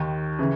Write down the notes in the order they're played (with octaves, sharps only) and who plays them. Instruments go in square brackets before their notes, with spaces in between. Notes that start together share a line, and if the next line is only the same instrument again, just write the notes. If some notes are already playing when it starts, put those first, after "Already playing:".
Already playing: [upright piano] D#2 D#3
C#3 E3